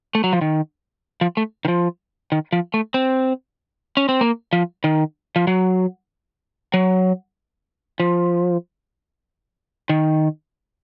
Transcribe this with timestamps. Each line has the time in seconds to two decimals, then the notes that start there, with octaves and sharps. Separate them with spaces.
0.15 A3
0.24 F#3
0.33 F3
0.41 D#3
1.21 F3
1.37 A3
1.65 D#3
1.68 F3
2.32 D#3
2.53 F3
2.74 A3
2.94 C4
3.97 C#4
4.09 C4
4.21 A#3
4.53 F3
4.84 D#3
5.36 F3
5.47 F#3
6.74 F#3
8.00 F3
9.89 D#3